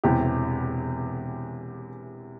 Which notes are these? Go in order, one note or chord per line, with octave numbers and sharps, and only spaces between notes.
E1 E2 C3 E3 G4